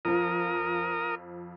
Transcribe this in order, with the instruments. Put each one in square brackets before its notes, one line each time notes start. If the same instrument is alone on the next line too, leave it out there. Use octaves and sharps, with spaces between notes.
[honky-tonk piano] F2 F3 [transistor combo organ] A#4 D#6